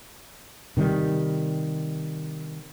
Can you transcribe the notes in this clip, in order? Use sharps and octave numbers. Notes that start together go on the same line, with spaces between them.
C3 D#3 G3